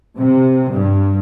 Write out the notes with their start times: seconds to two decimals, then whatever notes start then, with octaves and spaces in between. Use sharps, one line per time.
0.17 C3
0.70 G2